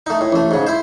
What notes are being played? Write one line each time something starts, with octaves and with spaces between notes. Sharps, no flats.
A3 D#4
A2
A1 A3
G#2 C#3
E4 C5